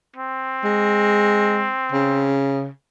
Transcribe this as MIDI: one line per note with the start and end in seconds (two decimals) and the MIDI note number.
0.16 2.44 60
0.64 1.70 56
1.92 2.68 49